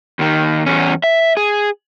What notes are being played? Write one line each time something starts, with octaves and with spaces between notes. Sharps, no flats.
D#2 D#3
E2 C#4
E5
G#4